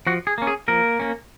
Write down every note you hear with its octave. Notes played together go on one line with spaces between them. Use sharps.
F3 F#4
G#4
A#3 C#4
G#4
F3 A#3 A#4
A#3 C#4